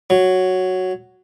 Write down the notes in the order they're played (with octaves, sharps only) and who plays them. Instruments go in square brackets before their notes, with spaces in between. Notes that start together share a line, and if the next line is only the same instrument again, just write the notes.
[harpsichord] F#3